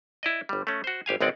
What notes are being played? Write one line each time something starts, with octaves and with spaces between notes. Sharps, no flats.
E4 D5 D#5
G1 G3
A3 C#4
F#4 C5
G#1 G4 F5 G#5
G#1 C#2 G#3 C4 D5 F#5